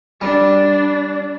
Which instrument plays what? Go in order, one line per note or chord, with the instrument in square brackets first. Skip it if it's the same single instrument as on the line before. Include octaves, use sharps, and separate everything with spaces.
[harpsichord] G3 [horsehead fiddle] D4